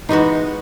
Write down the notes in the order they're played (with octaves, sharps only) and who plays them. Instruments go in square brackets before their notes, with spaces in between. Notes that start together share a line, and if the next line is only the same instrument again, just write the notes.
[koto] E3 G#3 B3 F#4 [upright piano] D#4